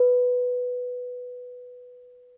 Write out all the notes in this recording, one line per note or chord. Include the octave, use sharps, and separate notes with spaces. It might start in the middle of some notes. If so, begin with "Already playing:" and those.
Already playing: B4